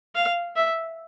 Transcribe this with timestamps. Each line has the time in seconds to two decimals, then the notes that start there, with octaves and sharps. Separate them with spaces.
0.15 F5
0.56 E5